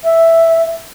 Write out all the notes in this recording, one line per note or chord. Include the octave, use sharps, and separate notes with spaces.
E5